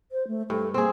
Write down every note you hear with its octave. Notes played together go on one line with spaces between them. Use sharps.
C5
A3
G2 A4
A#3 C4 G#4